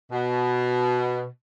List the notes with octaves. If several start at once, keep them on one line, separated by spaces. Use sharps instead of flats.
B2